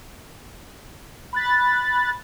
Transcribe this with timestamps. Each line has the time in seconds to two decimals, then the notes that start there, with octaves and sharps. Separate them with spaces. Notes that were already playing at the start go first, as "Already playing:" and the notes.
1.33 B5 F#6 A6